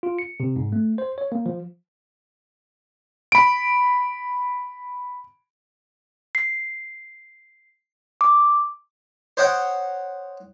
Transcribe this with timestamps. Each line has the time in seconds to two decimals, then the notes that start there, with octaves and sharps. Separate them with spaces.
0.03 F4
0.19 C#7
0.40 C3
0.56 G#2
0.72 A3
0.98 C5
1.18 C#5
1.32 A#3
1.46 F3
3.32 B5 D7
6.35 C7
8.21 D6
9.37 C5 C#5 D#5 F#5 G5